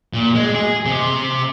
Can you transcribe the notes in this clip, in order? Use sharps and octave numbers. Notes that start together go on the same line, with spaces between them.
A#2
G#3
G#4
C3